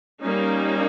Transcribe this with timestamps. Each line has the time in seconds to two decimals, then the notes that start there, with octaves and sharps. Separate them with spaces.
0.21 G3 A#3 C#4 D#4